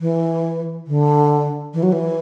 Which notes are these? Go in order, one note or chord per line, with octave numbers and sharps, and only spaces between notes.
E3
D3
E3
F#3
E3